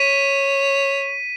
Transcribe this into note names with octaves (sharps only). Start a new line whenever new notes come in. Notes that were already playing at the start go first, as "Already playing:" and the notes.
Already playing: C#5 B6 D#7